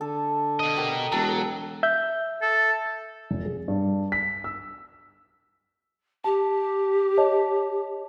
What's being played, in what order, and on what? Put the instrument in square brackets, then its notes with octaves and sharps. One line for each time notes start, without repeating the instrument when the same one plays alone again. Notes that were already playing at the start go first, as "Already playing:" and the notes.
[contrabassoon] D3 [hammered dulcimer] A4
[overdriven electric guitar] B2 D#5
[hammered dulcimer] G4 A#4
[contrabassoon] E1 [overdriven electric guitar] F#3 [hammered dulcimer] A4
[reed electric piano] E5 G6
[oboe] A4
[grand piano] F1
G#4
G2
B6
E6
[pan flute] G4 [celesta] A5
[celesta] C#5 D#5 A5